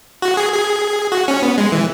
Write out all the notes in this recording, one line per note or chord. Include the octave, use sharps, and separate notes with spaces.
F#4
G#4
G#4
F#4
C#4
B3
G#3
E3